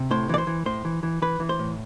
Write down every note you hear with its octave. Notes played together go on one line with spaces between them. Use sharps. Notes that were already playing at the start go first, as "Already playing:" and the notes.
Already playing: C3
A2 C5
E3 D5
C5
E3
A2 C5
E3
E3
E3 B4
E3
C5
A2